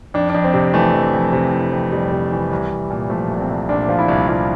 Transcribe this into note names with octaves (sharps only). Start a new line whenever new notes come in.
F2 D4
F2 D4
C4
C3
E3 A3
F2
F2
C3
E3
F2
F2 G3
C3
E3
C2
C2
A#2
F3 A3
C2
C4
C2
A#2 D4
F3 F4
E4
C2
C2 F4